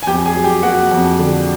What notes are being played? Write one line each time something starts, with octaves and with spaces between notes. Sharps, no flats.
G#5
F2 G4 G5
G#4 G#5
F#3
G4 G5
A#3 F#4 F#5
F2
D3